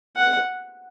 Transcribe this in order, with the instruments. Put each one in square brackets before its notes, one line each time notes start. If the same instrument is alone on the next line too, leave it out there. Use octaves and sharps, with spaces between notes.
[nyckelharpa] F#5